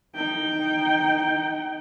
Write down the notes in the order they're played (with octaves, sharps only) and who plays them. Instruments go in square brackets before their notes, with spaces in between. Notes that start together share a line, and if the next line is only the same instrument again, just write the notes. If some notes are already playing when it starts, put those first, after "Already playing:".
[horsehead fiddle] D#4 G5